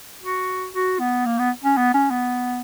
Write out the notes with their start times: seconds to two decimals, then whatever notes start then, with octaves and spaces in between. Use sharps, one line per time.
0.22 F#4
0.74 F#4
0.99 B3
1.26 A#3
1.39 B3
1.64 C#4
1.77 B3
1.94 C#4
2.11 B3